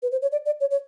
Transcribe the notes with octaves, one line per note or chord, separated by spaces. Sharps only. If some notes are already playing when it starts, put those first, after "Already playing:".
B4
C5
C#5
D5
D5
C#5
C#5